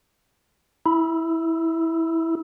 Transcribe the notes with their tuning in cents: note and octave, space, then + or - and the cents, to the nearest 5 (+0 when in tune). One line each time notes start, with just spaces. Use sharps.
E4 -10